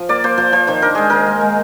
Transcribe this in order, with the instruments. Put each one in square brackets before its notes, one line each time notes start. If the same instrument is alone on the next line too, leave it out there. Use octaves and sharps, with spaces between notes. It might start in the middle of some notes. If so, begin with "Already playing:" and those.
Already playing: [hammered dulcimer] F3
A#3 D5
A#3 C5
F3 C5
F3 C5
D#3 C5
D4 A#4
G#3 G#4
D#3 A#4
G#3
G#3